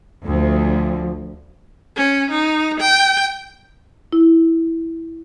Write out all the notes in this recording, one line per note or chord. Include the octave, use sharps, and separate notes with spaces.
D2 F3
C#4
D#4
G5
E4